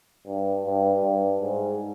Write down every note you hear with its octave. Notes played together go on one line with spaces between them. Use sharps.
G2
G2
G2
G#2